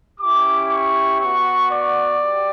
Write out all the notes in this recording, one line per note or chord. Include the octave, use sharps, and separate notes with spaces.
C#4 E4 G4 D6
C#6
B3 F#4 C#6
D5
G4